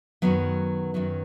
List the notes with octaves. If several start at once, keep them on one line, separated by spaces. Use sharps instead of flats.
F#2 D#3 F#3 B3
F#2 D#3 F#3